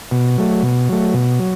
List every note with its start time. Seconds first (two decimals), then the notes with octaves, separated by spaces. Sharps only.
0.11 B2
0.38 F#3 A3
0.63 B2
0.89 F#3 A3
1.14 B2
1.39 F#3